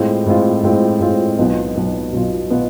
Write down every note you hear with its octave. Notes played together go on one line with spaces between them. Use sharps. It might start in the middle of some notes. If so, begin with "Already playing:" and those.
Already playing: A2 G#3 C4 F4
A2 G#3 C4 F4
A2 G#3 C4 F4
A2 G#3 C4 F4
B1 B2 B3 F4
B1 B2 B3 F4
B1 B2 B3 F4
B2 B3 F4